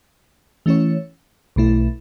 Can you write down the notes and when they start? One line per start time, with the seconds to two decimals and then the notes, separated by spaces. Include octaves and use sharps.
0.66 E3 A3 C#4 E4 C#5
1.56 B1 B2 A3 E4